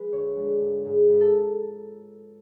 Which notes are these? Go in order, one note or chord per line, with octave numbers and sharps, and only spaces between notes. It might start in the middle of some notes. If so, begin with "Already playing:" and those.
Already playing: F3 G#3 B4
D2 C#5
D3 F3 G#3
G#1
G#2 G#3
G#1
A4